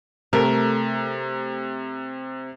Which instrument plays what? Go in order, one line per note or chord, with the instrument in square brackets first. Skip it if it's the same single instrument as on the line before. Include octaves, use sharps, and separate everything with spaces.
[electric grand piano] C3 [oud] A3 [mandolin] A#4